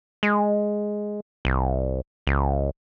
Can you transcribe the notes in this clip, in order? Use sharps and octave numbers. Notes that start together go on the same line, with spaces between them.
G#3
C2
C#2